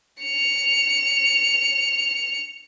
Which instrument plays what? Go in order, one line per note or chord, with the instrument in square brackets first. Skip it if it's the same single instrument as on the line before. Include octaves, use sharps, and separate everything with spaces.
[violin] C#7 F7